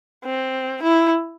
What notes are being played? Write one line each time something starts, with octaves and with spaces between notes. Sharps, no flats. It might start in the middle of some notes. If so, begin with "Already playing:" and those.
C4
E4